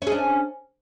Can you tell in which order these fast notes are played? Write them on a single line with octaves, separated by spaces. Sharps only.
C#4 G#4 D4